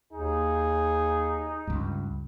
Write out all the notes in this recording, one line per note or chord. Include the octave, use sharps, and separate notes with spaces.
D#2 D#4 G#4
C#2 G2